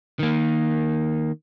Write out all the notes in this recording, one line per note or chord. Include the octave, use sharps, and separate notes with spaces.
D#3 A#3